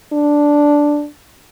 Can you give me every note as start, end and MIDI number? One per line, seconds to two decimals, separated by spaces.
0.13 1.06 62